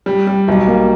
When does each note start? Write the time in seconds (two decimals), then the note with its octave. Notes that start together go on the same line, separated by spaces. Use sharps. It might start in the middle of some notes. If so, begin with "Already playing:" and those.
0.06 G3
0.27 G3
0.48 B1
0.68 A#3